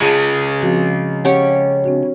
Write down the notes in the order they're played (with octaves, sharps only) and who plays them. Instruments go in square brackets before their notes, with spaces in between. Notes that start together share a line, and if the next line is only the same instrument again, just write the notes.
[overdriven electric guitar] C#3 G#3 [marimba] F4 G#4 A5
[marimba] F3 C4 F#4
[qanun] C#4 G4 C#5 [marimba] F#5
[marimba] C4 D4 F#4